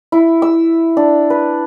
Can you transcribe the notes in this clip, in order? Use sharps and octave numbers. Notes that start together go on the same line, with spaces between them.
E4
E6
D4
B4